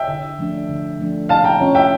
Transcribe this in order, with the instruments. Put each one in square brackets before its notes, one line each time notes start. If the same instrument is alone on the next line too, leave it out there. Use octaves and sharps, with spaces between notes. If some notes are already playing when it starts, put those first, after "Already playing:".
Already playing: [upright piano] E5 G5
[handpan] D3
F3 A3 D4
D3
F3 A3 D4
[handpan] A#2 [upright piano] F5 A5
[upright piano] G5 A#5
[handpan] A3 C#4 F4 C#5
[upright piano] E5 G5